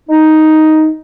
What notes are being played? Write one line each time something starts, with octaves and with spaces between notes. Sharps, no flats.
D#4